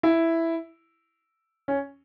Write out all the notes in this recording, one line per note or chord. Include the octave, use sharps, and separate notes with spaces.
E4
C#4